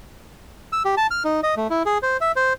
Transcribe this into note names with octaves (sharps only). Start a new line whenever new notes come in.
E6
G4
A5
F6
D#4
D#5
A3
E4
G#4
C5
E5
C5